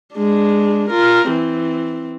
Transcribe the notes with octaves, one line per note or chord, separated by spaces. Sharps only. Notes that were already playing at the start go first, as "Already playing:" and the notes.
G#3 D4
F4 A#4
E3 C4